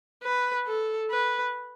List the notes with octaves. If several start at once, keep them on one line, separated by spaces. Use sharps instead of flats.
B4
A4
B4